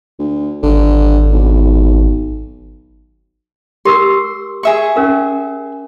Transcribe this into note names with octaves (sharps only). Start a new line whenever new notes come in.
D2
G#1 D3
B1
G4 A#4 C6 E6
G#4 E5 C#6
C#4 A#4 F5